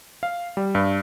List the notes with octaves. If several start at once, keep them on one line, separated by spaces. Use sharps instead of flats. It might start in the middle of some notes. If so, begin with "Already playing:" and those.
F5
G3
G2